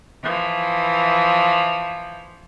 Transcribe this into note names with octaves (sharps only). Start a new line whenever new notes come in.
E3 F3